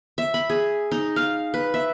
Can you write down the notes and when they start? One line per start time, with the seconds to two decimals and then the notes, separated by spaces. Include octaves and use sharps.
0.18 E5
0.34 B5
0.50 G#4
0.91 D#4
1.16 F5
1.54 B4
1.74 E5